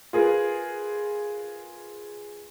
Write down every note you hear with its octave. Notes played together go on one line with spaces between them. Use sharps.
F4 G#4 A#4 B4